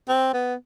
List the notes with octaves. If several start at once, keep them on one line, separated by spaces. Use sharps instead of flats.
C4
B3